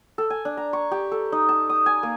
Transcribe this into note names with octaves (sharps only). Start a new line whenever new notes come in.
A4
G#5
D4
A#5
C#6
G4
A4
D#4
A5
D#6
G#5
A#3